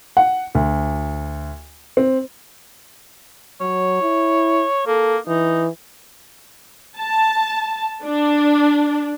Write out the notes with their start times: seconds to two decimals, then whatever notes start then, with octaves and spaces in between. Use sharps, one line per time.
0.17 F#5
0.55 D2
1.97 C4
3.61 F#3 C#5
4.02 E4
4.87 A#3 A4
5.27 E3 D#4
6.99 A5
8.04 D4